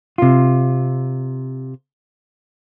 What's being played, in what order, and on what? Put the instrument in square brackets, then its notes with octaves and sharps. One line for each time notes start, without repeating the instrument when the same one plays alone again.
[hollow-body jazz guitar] C3 F4